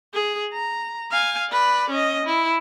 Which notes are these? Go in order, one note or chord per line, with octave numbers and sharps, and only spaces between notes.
G#4
A#5
F5 G#5
B4 D5
C#4 D#5
E4